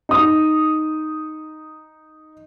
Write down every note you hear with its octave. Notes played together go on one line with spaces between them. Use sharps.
D#4 D#6